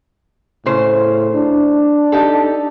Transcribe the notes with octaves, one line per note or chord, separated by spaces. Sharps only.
A2 C#3 C5
D4
D#4 G4 A4